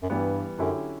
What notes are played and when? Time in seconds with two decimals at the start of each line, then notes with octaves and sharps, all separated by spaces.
0.03 F#2
0.10 G2 E3 G3 B3
0.59 F#2 D3 F#3 C#4 E4 G4